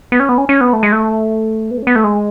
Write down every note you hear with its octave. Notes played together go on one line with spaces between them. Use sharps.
B3
C#4
B3
C#4
C#4
B3
A3
G#3
A3
B3
A3
C#4
B3
A3
G#3